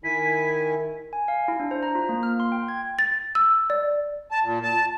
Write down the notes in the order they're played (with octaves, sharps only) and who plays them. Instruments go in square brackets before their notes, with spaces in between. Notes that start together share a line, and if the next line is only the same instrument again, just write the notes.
[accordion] D#3 E4 G#5 [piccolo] B6
[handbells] G#5
F5
E4
D4
C5
A#5
F4
A#3
F6
C6
G5
G#6
[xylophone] A6
E6
D5
[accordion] A5
A#2
A5